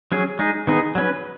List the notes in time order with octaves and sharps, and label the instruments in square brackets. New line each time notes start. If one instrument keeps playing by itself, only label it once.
[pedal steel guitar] F#3 C#4 G#4
G#3 D#4 G#4
D#3 B3 D#4 G#4
F#3 C#4 B4